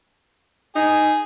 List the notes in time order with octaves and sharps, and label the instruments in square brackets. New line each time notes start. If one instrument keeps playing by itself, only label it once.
[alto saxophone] D#4 [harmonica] G#4